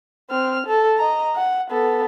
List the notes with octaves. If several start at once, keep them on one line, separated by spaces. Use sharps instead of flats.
C4 F6
A4
D#5 A#5
F#5
B3 A4